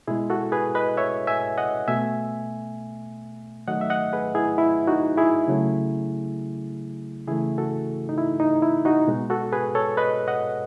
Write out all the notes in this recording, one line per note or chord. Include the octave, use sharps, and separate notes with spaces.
B2 G#3 E4 G#4
F#4 A4
G#4 B4
B4 D#5
C#5 E5
E5 G#5
D#5 F#5
B2 A3 E5 G#5
D#3 F#3 A3 D#5 F#5
E5
D#5 F#5
G#4 B4
E4 G#4
E4
D#4 F#4
E4 G#4
C#3 F#3 A3
C#3 E3 A3 E4 G#4
F#4 A4
D#4
E4
D#4
E4
D#4 F#4
B2 G#3
F#4 A4
G#4 B4
A4 C#5
B4 D#5
D#5 F#5